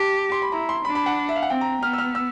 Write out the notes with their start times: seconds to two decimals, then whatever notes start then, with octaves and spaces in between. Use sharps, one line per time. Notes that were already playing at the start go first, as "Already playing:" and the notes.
Already playing: G4 A5
0.32 C6
0.42 B5
0.52 E4 A#5
0.69 C6
0.85 D4 B5
0.95 B5
1.06 F#5
1.29 E5
1.36 F5
1.43 F#5
1.50 C4 G5
1.61 A#5
1.82 B3 F6
1.93 E6
1.98 F6
2.15 E6